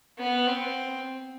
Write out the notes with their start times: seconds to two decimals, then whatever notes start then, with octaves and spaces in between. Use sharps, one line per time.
0.18 B3
0.47 C4